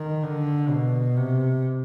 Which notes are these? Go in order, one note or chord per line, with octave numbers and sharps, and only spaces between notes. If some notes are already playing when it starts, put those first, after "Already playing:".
Already playing: D#3
D3
B2
C3